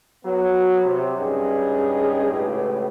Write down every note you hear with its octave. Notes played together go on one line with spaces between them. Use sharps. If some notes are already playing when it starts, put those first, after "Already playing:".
F#3 B3
C3
G2 C#4 D#4 G#4
C#2 A2 G4 B4